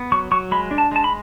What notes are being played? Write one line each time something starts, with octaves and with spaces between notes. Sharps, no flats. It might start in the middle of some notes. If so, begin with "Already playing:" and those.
Already playing: B3
F#3 C#6
F#3 C#6
G#3 B5
D4
A5
G#3 A5
B5